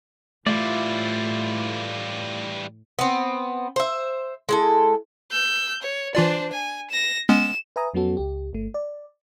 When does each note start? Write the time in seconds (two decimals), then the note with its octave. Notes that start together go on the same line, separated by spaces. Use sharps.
0.47 A2 E3 G3 A3 E4 F4 D5
2.99 B3 C4
3.76 C5 E5
4.49 G#3 E4 A4
5.31 E6 G6
5.82 C#5
6.15 E3 D4 F4 C5 D5
6.52 G#5
6.90 A#6 E7
7.29 G#3 B3 C#4 E7
7.76 B4 E5 G#5 A#5 D#6
7.94 F2 F#3 B3 C#4 F#4 A4
8.17 C#2 G4
8.53 G1 A3
8.74 D5